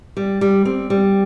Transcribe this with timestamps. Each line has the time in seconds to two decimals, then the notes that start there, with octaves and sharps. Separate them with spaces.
0.17 G3
0.41 G3
0.65 C4
0.90 G3